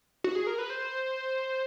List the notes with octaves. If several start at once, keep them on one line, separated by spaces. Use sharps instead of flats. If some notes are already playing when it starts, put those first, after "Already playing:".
F#4
G#4
A#4
B4
C5